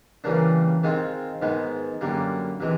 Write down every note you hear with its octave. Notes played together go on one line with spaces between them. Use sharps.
C#3 E3 G3 A#3 D4
D#3 G#3 C4 F4
G#2 D#3 G#3 B3
F#2 D3 G3 A#3
C3 E3 G#3